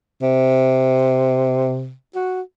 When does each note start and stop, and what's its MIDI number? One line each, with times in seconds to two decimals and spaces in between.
0.22 1.93 48
2.15 2.41 66